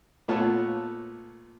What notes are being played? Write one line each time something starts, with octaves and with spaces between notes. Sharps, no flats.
A#2 A3 B3 F4 C#5 A5